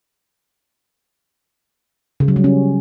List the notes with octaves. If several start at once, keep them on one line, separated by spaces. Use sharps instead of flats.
C#3
F#3
G3
C#4